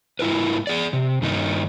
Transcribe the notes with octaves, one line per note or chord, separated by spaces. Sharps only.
G#2 E4 A#4 B4
G#4 D5
C3
G2 D#3 A#3 D#4